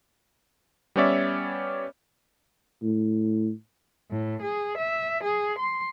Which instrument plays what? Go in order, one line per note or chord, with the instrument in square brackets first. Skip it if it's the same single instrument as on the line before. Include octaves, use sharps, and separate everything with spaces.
[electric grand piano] G3 B3 C#4 C#5 D5 E5
[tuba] A2
[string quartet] A2
G#4
E5
G#4
C6